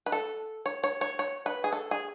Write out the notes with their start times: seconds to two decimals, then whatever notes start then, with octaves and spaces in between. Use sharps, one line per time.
0.06 B4
0.12 A4
0.66 C#5
0.84 C#5
1.01 C#5
1.19 C#5
1.46 B4
1.64 G#4
1.72 A4
1.91 G#4